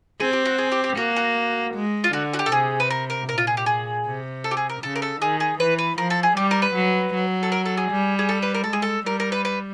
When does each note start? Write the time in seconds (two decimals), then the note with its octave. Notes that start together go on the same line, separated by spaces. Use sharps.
0.20 C4 G#4
0.33 G4
0.45 F#4
0.58 G#4
0.72 G4
0.84 G4
0.97 A#3 F#4
1.16 F#4
1.74 G#3
2.04 F4
2.13 D3 F#4
2.33 F#4
2.39 G4
2.46 A4
2.52 C3 G#4
2.80 B4
2.90 A#4
3.10 A#4
3.28 A#2 A#4
3.38 F4
3.47 G#4
3.57 G4
3.66 G#4
4.06 C3
4.44 A4
4.51 G4
4.57 G#4
4.69 A#4
4.82 C#3 A4
4.96 A#4
5.02 A4
5.21 D#3 G#4
5.40 G#4
5.59 E3 B4
5.78 B4
5.98 F3 A#4
6.10 A4
6.23 G#4
6.36 G3 G4
6.51 A#4
6.62 B4
6.75 F#3
7.14 F#3
7.43 A4
7.52 A#4
7.65 A4
7.77 G#4
7.91 G3
8.19 G#4
8.29 A4
8.42 B4
8.54 A#4
8.64 G#3 A4
8.73 G#4
8.82 A4
9.06 G3 A#4
9.20 A#4
9.32 B4
9.45 B4